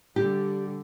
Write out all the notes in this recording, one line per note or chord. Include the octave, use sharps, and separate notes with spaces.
D3 G3 G4